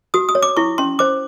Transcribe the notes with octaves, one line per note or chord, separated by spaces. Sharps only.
F#4 D#6
D#6
C#5
D6
E4 C#6
C#4 C6
C5 D6